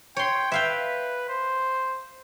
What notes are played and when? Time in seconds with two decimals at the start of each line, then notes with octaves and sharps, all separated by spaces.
0.16 C#5 G5 C6
0.52 B4 E5 F5 G5
1.29 C5